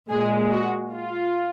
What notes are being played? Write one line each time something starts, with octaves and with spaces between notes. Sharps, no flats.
A#2 G#3 G#4
F#4
F4